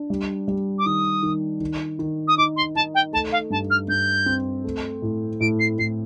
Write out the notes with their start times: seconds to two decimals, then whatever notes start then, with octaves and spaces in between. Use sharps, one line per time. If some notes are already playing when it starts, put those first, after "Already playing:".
Already playing: D4
0.10 G3
0.48 G3
0.78 D6
0.86 D#3 D#6
1.23 D#3
1.61 D#3
1.99 D#3
2.27 D#6
2.37 D#4 D6
2.56 C6
2.75 D#4 A5
2.94 G5
3.13 A3 A5
3.32 F5
3.50 G2 A5
3.70 F6
3.88 G2 G6
4.26 C4
4.64 A3
5.02 A2
5.40 A2 D7
5.59 C7
5.79 A2 C7